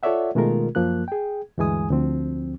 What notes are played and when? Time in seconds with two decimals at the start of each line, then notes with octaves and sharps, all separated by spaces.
0.03 F4 A4 C#5 D5 E5 F#5
0.35 B2 D#3 G#3 A3 F4 A#4
0.75 F#2 F3 A#3 F#6
1.08 G#4 G5
1.58 D2 G2 E3 G#3 G#5 D#6
1.90 D2 F3 C4